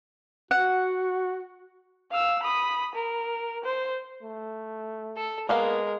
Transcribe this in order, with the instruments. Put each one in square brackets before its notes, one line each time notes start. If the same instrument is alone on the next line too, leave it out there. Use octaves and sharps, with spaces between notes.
[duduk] F#4 [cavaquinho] F#5
[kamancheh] F5 E6
B5 D#6
A#4
C5
[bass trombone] A3
[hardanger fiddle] A4
[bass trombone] G#3 [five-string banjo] A#3 B3 F5 [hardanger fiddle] A#4